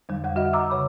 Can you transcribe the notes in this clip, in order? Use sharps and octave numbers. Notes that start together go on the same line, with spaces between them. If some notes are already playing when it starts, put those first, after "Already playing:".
F2 D3 G3
F2 G3 F#5
F#4 D#5 E5 F#5
A#5 D6 E6
C#3 C#5 B5